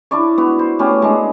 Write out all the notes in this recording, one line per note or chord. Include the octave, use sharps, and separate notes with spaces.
D4 E4 D5 C#6
B3 F#4
C5
A3 B3 C#4 G4
G#3 D4